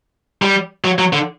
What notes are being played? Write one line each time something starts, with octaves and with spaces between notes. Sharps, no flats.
G3
F#3
F#3
D3